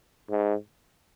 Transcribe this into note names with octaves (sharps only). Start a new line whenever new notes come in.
G#2